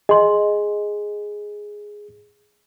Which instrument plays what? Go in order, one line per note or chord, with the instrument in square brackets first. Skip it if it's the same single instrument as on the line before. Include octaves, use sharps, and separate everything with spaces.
[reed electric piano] G#4 [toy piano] D#5 C6